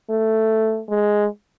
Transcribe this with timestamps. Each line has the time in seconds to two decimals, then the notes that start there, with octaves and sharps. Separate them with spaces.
0.10 A3
0.90 G#3